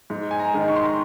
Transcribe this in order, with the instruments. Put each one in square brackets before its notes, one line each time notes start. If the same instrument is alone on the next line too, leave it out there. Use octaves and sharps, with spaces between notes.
[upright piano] G#2
G#5
A#5
D#3 G#3
C#6
C6
A#5